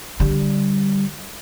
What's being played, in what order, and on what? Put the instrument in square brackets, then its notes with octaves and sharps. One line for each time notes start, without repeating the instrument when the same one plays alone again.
[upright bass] D3 G3